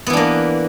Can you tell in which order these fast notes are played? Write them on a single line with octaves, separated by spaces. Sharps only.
B3 E3 D4 A#3